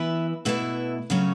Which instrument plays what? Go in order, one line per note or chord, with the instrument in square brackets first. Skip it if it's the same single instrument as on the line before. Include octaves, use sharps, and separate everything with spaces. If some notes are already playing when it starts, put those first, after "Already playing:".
Already playing: [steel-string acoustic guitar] E3 B3 E4 B4 E5
B2 A3 E4 B4 E5
C#3 F#3 A3 C#4